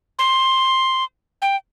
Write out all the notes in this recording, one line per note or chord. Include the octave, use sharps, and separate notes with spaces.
C6
G5